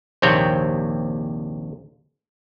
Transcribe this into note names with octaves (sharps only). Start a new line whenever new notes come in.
A#1 D#2 C3 C4 C#5 G5